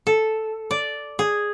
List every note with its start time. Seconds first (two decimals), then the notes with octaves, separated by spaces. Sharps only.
0.07 A4
0.71 D5
1.19 G#4